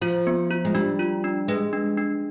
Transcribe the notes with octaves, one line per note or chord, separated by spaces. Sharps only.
F3 F4
B3
F4
G#3
G3 D4
F4
D4
G#3 B4
D4
D4